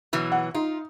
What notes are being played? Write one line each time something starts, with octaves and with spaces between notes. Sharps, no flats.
B2 E3 F#3
F#5
D#4 F4